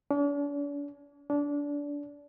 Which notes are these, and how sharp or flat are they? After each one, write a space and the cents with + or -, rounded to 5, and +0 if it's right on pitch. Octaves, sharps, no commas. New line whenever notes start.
D4 -45
D4 -25